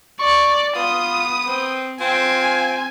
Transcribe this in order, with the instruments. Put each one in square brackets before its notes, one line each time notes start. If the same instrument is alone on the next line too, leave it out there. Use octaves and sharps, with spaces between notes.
[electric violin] D5 [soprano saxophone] C#6
[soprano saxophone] B3 [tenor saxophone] F4 [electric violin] D#6
[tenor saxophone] C4
[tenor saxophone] C4 [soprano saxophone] F4 [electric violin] G#5